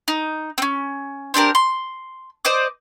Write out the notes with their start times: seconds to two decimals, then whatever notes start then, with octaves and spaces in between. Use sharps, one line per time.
0.08 D#4
0.58 C4 C#4
1.34 C4 D4 G4 A#4
1.55 C6
2.45 C5 D5 D#5 D6